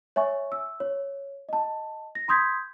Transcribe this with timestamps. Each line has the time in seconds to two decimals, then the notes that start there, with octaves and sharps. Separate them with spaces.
0.16 C#5 E5 G#5 C#6
0.52 E6
0.80 C#5
1.49 D#5 A5
2.15 A#6
2.28 B5 C6 D#6 G6 G#6 B6